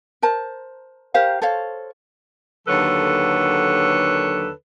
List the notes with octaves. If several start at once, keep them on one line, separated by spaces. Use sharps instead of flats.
A#4 C5 A5
G4 A#4 C5 F5
A4 C5 C#5 F5
D#2 D3 F#3 A4 B4 C#5